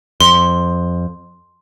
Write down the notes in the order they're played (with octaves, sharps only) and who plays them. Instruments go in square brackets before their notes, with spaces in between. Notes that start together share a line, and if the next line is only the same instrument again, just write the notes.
[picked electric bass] F2 [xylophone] C6